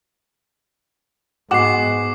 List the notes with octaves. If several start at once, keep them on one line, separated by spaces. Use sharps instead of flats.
G#2 G#3 B3 F#4 F#5 D6 C7 E7